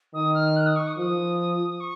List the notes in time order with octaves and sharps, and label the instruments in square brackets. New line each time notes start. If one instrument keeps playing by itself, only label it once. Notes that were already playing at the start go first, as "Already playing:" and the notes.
[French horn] D#3 [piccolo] D#6
[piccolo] F6
F#6
D#6
C#6
D#6
[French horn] F3 [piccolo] D#6
[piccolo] C#6